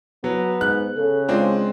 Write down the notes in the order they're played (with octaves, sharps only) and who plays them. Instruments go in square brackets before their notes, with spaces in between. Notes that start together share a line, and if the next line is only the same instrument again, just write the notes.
[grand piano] F#3 [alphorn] B3
[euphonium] G#2 [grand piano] F#6
[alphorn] C#3 [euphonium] A4
[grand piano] G#3 C4 D4 [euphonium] F4